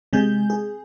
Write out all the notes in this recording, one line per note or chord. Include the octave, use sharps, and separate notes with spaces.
C3 G#3 G#4 G6
G#4